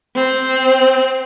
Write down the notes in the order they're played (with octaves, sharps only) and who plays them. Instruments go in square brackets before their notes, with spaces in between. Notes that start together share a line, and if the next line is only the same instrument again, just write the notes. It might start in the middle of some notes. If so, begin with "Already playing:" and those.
[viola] C4